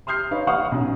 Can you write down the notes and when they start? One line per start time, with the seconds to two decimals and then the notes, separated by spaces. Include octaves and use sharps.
0.07 C6 D#6 F6 G6 C7
0.31 D#4 B4 C#5 F5
0.47 F5 F#5 C#6 D#6 F6
0.72 B1 C#4